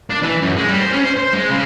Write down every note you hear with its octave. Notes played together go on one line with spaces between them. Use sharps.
D4
E3
F#2
G#3
G3
C5
C#4
C5
C5
G#3
C#3